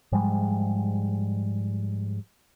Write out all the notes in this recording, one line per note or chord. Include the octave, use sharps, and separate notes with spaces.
G#2 F3 G3 G#3